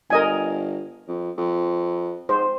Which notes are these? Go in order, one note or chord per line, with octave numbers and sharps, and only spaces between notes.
G1 A#4 D#5 G#5
F2
F2
G#2 C5